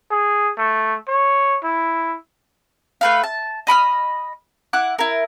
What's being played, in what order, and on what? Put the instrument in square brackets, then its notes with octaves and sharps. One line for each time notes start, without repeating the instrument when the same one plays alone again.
[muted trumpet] G#4
A3
C#5
E4
[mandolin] A3 B4 F5
A5
D#5 B5 D6 F6
E4 F#5 D6 F#6
E4 A#4